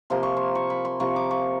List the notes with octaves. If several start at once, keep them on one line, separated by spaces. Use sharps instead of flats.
C3 F3 A#3 C6
C#6
C6
C#6
B5
C6
C3 F3 A#3 C#6
D6
C#6